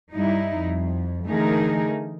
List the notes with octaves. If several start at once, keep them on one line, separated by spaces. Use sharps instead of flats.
G2 G3 D#4 E4
F2
D3 E3 A3 D#4 G#4 A#4